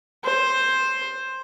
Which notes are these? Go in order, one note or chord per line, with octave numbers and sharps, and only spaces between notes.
C5